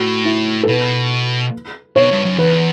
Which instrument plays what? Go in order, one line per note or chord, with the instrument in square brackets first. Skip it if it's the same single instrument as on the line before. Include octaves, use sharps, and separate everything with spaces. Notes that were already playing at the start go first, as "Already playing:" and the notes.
Already playing: [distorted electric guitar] A2 [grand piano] F#4
[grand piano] E4
A4
[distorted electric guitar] B2 [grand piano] B4
[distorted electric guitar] B2 [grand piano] C#5
[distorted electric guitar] G2
F#2
[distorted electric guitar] E2 [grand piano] B4